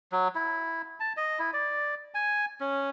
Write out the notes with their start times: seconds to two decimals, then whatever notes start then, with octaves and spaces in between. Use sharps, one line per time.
0.12 F#3
0.35 E4
1.00 A5
1.17 D#5
1.39 E4
1.53 D5
2.14 G#5
2.60 C#4